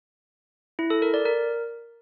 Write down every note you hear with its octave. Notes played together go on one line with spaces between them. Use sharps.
E4
A4
A#4
D5
A#4